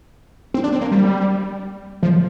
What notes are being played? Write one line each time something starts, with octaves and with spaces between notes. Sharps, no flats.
C4
D4
C4
A#3
G3
F3